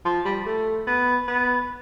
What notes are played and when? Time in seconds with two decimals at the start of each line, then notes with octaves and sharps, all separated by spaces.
0.05 F3
0.25 G3
0.46 A3
0.87 B3
1.28 B3